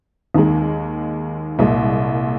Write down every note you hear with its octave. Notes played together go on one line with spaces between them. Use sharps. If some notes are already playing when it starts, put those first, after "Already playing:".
D#2 D#3 G#3
C2 A#2 G#3